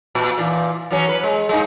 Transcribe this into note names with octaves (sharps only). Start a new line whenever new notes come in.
A#2
A#2 E3
E3 F#3 C#4
B4
G#3
G#3 A#3 D#4